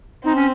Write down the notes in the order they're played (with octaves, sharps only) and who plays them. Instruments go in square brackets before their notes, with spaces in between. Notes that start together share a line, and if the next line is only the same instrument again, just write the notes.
[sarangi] C4 [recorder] D#4
[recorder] C#4